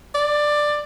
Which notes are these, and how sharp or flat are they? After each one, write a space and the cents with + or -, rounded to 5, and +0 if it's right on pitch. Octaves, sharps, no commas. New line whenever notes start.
D5 +10